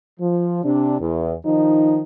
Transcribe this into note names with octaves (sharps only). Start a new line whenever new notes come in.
F3
C3 D4
E2
D#3 F3 D#4